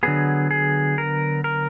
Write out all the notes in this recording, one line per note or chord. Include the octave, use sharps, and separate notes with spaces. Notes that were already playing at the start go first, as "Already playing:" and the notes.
D3 F#3 B3 G#4
G#4
A#4
A#4